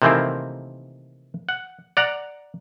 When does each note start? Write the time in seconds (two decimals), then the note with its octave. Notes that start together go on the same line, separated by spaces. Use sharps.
0.02 C3 D#3 E3 A3 A#3 C4
1.49 F#5
1.97 D5 F#5 A#5